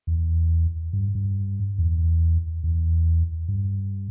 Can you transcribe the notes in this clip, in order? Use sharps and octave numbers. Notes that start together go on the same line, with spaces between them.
E2
G2
G2
E2
E2
G2